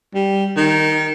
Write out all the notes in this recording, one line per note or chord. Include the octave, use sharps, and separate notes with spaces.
G3
D#3